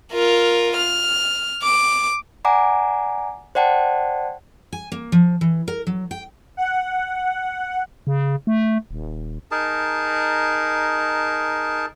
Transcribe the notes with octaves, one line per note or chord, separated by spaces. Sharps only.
F4 A#4
F6
D6
D5 F#5 G#5 A#5 D6
C5 D5 F#5 G5 A5
G#5
A#3
F3
E3
A#4
F#3
G5
F#5
C#3
A3
D#1
D#4 G#4 A#4 A5